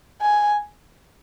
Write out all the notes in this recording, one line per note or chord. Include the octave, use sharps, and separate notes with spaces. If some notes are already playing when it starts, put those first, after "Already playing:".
G#5